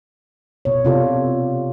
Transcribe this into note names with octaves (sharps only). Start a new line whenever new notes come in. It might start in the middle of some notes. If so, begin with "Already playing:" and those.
B2 C#5
C3 F4 A4 D5